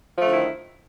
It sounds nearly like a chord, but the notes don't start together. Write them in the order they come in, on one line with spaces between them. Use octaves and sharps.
F3 A3 D3 E4 D#3